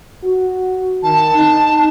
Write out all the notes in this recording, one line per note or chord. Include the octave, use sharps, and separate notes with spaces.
F#4
D#3 A5
D#4